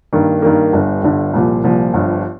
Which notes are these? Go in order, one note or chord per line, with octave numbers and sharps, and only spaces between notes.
G2 D#3 A#3
G2 D#3 A#3
G1 G2 D3
G1 G2 D3
C2 A#2 F3
C2 A#2 F3
G1 G2 F3